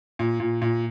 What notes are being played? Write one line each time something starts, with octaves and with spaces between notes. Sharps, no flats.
A#2
A#2
A#2